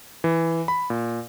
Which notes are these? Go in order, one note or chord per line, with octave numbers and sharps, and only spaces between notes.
E3
B5
A#2